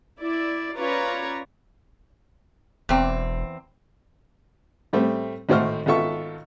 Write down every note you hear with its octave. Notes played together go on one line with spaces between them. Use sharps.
E4 D5
C#4 F4 B4 C#5 D5 A#5
E1 E2 C4
A2 G3 A3 C4
G#1 A2 A3 C5 C#6 F6
G#1 B3 F4 A4 E5 C#6